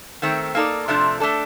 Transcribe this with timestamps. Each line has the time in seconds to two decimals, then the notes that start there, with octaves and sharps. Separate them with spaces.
0.22 D#3 A3 C4
0.55 A#3 D#4 A4 D5
0.88 C3 F3 A3 D4
1.20 A3 D4 A4